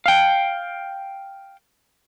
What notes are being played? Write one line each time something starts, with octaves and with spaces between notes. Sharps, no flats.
F5 G5